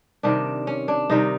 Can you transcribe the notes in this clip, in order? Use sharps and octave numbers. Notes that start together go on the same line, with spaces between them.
C3 D#3 G3 D4
C#4
D4
C3 D#3 G3 D#4